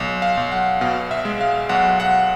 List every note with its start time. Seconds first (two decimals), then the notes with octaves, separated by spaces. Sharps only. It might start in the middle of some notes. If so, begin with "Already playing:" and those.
Already playing: B1
0.22 F5
0.37 B1
0.52 F#5
0.81 B2 F5
1.11 E5
1.25 G#3
1.41 F5
1.69 B1 F#5
2.00 F#5